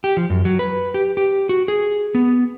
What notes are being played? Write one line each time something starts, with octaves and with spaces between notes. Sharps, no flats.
G4
F3
F#2
F#3
B4
G4
G4
F#4
G#4
B3